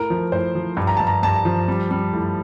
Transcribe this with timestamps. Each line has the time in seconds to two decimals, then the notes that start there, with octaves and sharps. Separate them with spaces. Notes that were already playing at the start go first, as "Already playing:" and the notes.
Already playing: A2 A#4
0.10 F3
0.32 A2 C5
0.55 F3
0.77 G2
0.87 A#5
0.97 G2 A5
1.07 A#5
1.23 G2 A5
1.45 F3
1.68 G3
1.91 G3
2.13 A2